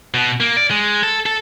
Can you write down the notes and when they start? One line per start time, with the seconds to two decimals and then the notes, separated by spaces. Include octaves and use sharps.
0.14 B2
0.40 A#3
0.56 D5
0.71 G#3
1.03 A4
1.26 A4